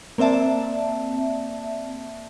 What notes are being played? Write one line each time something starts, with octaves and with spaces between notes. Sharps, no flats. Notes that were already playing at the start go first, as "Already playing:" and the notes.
A#3 C4 D5 E5 A5